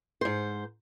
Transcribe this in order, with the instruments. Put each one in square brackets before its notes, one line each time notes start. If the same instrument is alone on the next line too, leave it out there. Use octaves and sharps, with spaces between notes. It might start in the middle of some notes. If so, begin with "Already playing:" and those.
[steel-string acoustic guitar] G#2 C5